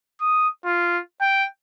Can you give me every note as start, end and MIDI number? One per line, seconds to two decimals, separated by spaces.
0.21 0.48 87
0.65 0.99 65
1.21 1.46 79